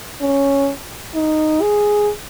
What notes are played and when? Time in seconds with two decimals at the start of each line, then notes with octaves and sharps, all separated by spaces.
0.21 C#4
1.15 D#4
1.61 G#4